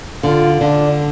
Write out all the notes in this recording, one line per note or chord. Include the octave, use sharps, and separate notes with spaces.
D3 F4
D3 D4